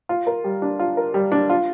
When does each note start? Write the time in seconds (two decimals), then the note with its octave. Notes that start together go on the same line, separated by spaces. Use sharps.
0.09 F4
0.27 A#4
0.44 G3
0.62 D4
0.79 F4
0.97 A#4
1.14 G3
1.32 D4
1.50 F4